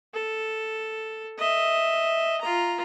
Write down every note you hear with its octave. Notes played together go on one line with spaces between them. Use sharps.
A4
D#5 E5
F4 A#5